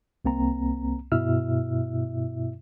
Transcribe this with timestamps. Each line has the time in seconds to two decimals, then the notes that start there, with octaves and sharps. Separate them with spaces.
0.25 C2 A#3 C4 A#5
1.12 G2 B2 E4 E5 E6 F6